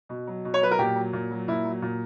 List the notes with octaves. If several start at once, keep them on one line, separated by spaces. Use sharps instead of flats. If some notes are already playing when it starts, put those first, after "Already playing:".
B2
F#3
B2
C#5
F#3 B4
A#4
A#2 G4
F#3
A#2
F#3
A#2 E4
F#3
A#2